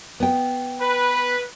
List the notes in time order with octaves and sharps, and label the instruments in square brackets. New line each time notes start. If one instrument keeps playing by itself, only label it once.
[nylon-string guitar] B3 G5
[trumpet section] B4